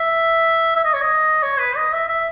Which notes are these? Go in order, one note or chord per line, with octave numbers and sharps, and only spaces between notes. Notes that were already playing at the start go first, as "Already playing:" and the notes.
Already playing: E5
E5
D#5
C#5
D#5
C#5
B4
D#5
E5
E5